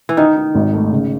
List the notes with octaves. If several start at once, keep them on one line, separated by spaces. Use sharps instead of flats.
E3
D#3 D#4
D#4
G#1
A3
C#3